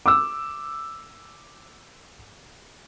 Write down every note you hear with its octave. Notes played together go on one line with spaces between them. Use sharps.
D6 E6